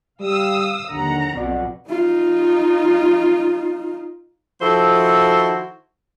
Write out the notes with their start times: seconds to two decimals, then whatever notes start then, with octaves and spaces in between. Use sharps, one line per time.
0.21 G3 F5 D#6 E6
0.90 D#2 D3 F#5 A#5
1.36 B1 F2 B2 F4 D5 F#5
1.89 D#4 F4
4.61 D#3 F3 E4 F#4 A4 C5